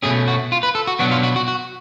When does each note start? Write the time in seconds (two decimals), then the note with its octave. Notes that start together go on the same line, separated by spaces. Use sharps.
0.03 B2 A3 C#4 G#4
0.28 F#4
0.52 F4
0.63 B4
0.75 A4
0.87 F#4
0.99 B2 F#3 B3 D4 F#4
1.11 F4
1.23 F#4
1.36 F#4
1.48 F#4